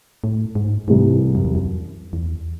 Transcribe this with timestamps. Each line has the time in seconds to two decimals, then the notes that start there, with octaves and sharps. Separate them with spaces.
0.24 A2
0.55 G#2
0.87 C2 G#2 C3 E3
1.35 F#2
1.45 E2
1.55 F#2
2.13 E2